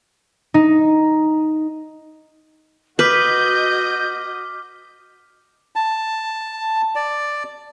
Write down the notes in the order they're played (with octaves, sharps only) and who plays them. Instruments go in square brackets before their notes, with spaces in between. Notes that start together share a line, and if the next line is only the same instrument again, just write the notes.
[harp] D#4
[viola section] F#4 D#5 [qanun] B4 [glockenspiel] D6 F6 B6 [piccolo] G6
[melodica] A5
D5